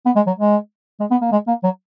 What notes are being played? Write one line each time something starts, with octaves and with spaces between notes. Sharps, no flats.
B3
G#3
F#3
G#3
G#3
B3
A#3
G#3
A#3
F#3